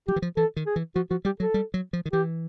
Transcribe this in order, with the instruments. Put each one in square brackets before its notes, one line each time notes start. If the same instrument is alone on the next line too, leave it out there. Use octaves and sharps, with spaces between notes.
[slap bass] F#3 [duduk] G4
[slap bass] E3
F3
[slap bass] E3 [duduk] A4
[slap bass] D#3
[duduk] G#4
[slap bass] E3
[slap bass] F3 [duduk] F#4
[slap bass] F3 [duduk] F#4
[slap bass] G3 [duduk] G4
[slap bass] F#3 [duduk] A4
[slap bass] G3
F#3
F3
D#3
[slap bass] E3 [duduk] G4